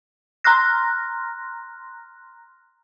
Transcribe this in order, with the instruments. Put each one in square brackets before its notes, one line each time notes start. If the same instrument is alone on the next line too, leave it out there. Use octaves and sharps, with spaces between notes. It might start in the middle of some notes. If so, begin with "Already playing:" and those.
[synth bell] A#5 C6 F6 F#6 A#6